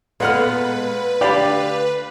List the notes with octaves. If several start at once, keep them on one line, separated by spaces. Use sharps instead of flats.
A#2 G#3 B3 A4 B4 F#5 F6
D2 D4 G4 D5 F5 B5